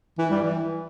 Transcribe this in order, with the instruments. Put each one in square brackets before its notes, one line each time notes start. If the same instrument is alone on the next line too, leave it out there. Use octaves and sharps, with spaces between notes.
[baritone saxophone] E3
G3
E3